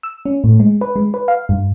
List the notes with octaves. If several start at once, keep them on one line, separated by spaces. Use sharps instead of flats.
E6
C#4
A2
G#3
B4
G#3
B4
F5
G2